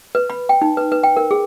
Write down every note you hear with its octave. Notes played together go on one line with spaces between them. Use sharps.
B4
B5
G5
D#4
B4
B4
G5
A#4
G#4